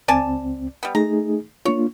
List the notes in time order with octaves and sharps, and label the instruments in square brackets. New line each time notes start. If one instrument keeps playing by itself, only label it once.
[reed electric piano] C#2 C4 [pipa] D5 G#5 A5
[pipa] G3 B3
[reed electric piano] A3 D#4 G#4 [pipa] A#5
[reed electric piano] A#3 D4 F4 [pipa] C#5